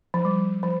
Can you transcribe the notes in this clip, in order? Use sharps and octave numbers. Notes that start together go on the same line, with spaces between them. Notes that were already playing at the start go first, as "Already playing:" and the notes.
F3
G3
F3